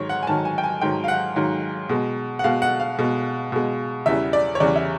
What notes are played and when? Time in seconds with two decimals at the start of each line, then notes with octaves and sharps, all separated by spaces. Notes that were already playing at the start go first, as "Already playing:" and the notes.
Already playing: G#2 D#3 F#3 C#5
0.09 F#5
0.23 G#5
0.27 G#2 D#3 F#3 A5
0.45 G#5
0.58 G5
0.64 G#5
0.81 G#2 D#3 F#3 G5
1.04 F5
1.08 F#5
1.36 G#2 D#3 F#3
1.89 B2 G#3
2.39 F#5
2.44 B2 G#3 F5
2.62 F#5
2.80 F5
2.99 B2 G#3
3.52 B2 G#3
4.06 E2 C#3 E3 G3 E5
4.33 D5
4.55 C#5
4.60 E2 C#3 E3 G3 D5
4.76 E5